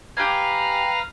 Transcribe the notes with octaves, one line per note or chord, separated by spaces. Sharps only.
G4 B4 F5 G#5 A#5